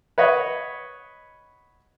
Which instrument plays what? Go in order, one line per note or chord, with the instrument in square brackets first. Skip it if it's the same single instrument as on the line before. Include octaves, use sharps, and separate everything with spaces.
[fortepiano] B4 C#5 D#5 F#5